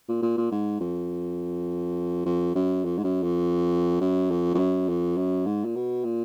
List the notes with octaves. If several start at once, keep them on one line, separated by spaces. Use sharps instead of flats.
A#2
A#2
A#2
G#2
F2
F2
F#2
F2
G#2
F#2
F2
F#2
F2
F2
F#2
F2
F#2
G#2
A#2
B2
A#2